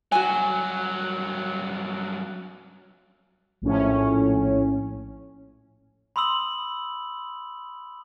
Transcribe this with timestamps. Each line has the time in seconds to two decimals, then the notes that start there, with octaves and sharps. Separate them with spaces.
0.12 G2 F#3 F#4 G#5
3.62 A#1 A2 C#4
6.16 B5 C6 D#6 E6 F#7